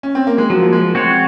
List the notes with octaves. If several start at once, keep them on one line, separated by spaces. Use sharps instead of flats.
C#4
C4
A#3
G#3
F3 F#3
A#3
G#3
G#3 C4 F#4 C#5